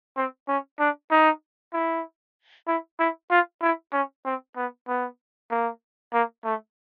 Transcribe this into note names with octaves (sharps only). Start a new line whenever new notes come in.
C4
C#4
D4
D#4
E4
E4
E4
F4
E4
C#4
C4
B3
B3
A#3
A#3
A3